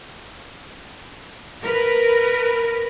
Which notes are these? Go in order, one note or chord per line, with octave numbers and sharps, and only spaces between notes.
A#4 B4